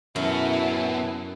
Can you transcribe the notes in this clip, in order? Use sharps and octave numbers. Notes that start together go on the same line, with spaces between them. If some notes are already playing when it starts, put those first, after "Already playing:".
F#2 B3 E4 F#4 A4 E5 G#5